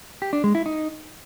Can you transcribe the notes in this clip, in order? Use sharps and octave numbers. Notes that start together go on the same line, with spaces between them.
G4
D4
G#3
E4
D#4